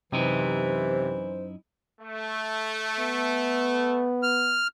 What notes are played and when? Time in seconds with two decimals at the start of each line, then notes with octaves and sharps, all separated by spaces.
0.12 F#2 C3 E3 D#4 E4 C5
2.01 A3
2.99 B3
4.23 F6